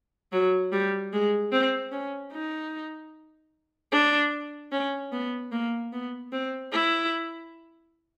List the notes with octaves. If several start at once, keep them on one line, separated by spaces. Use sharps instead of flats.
F#3
G3
G#3
C4
C#4
D#4
D4
C#4
B3
A#3
B3
C4
E4